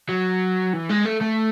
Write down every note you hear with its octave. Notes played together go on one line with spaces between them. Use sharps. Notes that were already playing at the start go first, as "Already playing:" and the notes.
F#3
E3
G#3
A3
A3